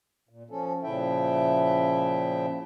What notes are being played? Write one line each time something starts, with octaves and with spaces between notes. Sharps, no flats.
A#2
F3 C#4 A4
A#2 C#3 F3 E4 E5 G5